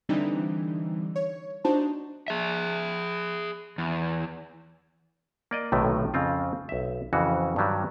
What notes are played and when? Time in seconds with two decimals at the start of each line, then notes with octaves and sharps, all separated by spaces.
0.09 D3 E3 G3 C4 D4 D#4
1.16 C#5
1.64 D4 D#4 F#4 C5 A5
2.28 G#4 E5
3.78 E2
5.51 A#3 D5 D#5
5.72 B1 A2 C3 D#3 A3 F#4
6.14 F2 C#3 C4 F4
6.69 B1 E5
7.13 F2 C#3 E3 F#4
7.56 G2 D#3 F#3 G3